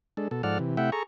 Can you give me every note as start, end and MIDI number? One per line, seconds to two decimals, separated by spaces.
0.17 0.28 56
0.17 0.28 62
0.17 0.28 69
0.31 0.42 47
0.31 0.42 69
0.43 0.58 44
0.43 0.58 53
0.43 0.58 69
0.43 0.58 74
0.43 0.58 78
0.43 0.58 89
0.59 0.77 48
0.59 0.77 52
0.77 0.90 48
0.77 0.90 57
0.77 0.90 64
0.77 0.90 76
0.77 0.90 78
0.77 0.90 79
0.92 1.03 68
0.92 1.03 69
0.92 1.03 82
0.92 1.03 85